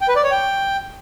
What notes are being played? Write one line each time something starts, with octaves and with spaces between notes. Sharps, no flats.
G5
B4
D5
C#5
G5